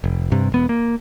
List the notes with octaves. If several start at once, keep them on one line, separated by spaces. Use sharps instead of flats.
F1
G2 C3
E1 B3
A#3